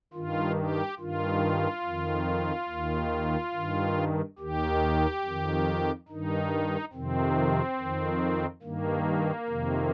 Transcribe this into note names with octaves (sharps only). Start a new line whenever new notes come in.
G2 D#3 F4
G4
G2 D#3 F4
F2
D#3
D#2 D#3
G2 D#3
D#2 D#3 G4
F2 D#3
G2 D#3 D#4
F2 C3 D#3 C4
F2 D#3
G2 D#3 A#3
F2 C3 D#3